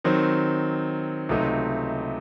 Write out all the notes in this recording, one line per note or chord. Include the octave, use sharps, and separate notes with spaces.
D#3 F#3 C4 D#4
C#2 C3 F#3 A3 D#4